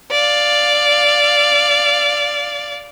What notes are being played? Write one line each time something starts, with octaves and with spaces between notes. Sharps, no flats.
D5 F5